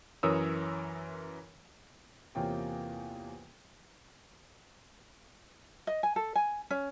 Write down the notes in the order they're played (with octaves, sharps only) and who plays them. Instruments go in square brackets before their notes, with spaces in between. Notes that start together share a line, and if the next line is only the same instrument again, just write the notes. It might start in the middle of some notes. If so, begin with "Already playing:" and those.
[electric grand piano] F#2 E3 A#4 C#5 D#6 E6
[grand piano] E2 C3 A#3 F4 C#5 G5
[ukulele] D#5
G#5
A4
G#5
C#4